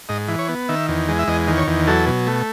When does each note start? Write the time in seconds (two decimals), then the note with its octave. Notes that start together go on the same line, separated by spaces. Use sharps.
0.09 G#2 D#5
0.28 E3
0.39 C#5
0.49 B3
0.69 D#3 E5
0.88 E2
1.08 G#3
1.19 E5
1.28 E2 D#5
1.48 D#3
1.57 C#5
1.67 E2
1.87 F#3 A4
2.07 B2
2.27 A3